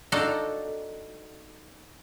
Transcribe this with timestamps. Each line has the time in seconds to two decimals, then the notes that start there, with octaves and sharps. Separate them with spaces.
0.12 D4 D#4 F4 F#4 A4